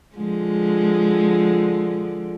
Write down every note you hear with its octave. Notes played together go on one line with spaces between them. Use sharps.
D3 F3 G#3